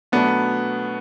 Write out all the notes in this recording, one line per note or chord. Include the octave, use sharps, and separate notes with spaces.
B2 F#3 A3 B3 D4